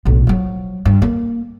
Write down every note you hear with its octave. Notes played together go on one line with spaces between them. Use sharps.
B1 A2
F3 F#3
G2
A#3